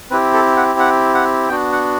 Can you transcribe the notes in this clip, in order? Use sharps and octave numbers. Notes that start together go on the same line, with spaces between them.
C4 E4 G4 B4
A4
F#5
F#5
F#5
B3 D4 F#4 G5
F#5